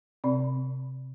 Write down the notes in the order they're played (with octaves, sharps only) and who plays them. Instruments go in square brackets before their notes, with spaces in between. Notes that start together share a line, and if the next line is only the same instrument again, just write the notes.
[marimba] C3 C4 D5 B5